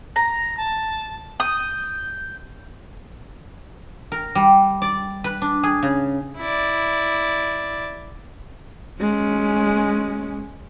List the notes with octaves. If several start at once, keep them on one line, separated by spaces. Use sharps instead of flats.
A#5 A#6
A5
D#6 G6
A#4
G3
D5
B4
D4
G#4
C#3
E4 D5
G#3 C#4